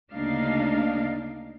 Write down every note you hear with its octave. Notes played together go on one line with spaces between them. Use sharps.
D2 C#3 A#3 D4 D#4 F5